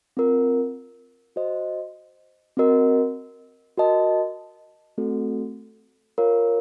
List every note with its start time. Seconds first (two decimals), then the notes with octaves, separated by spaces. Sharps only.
0.17 C4 F4 A#4
1.36 F#4 C5 D#5
2.57 C4 F#4 A#4 D#5
3.77 F#4 A#4 D#5 A5
4.98 A3 C4 F#4 A4
6.18 F4 A#4 C#5 F5